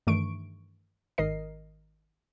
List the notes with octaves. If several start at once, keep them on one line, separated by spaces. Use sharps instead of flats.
G2 D#3 E3 A3 C#6 D7
G#1 D#3 A#4 D#5 C7